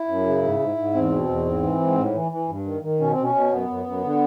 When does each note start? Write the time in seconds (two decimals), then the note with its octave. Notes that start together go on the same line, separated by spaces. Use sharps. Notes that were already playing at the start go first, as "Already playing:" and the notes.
Already playing: E4
0.08 F#2
0.26 C#3
0.42 G#2
0.59 G#2
0.77 G#2
0.94 E2 C4
1.12 B2
1.28 E2
1.46 G#2
1.63 E3
1.80 G#2
1.97 A2
2.14 E3
2.32 E3
2.49 G2
2.66 D#3
2.83 D#3
3.00 B2 C#4
3.12 C4
3.18 B2
3.23 C#4
3.35 B2
3.52 F#2 B3
3.69 F#2
3.86 F#2
4.03 D3